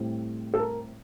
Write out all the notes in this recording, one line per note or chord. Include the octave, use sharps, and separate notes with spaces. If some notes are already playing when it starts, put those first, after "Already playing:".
Already playing: A2 G3 C4
A4
A#4